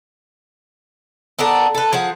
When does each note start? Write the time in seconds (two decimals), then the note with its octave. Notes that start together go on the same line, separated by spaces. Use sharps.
1.39 B3 D4 A4 A#4
1.75 A4 B4
1.93 F3 G#4 F#5